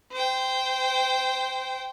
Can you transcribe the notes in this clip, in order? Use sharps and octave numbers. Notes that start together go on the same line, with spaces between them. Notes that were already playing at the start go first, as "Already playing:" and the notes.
C5 G5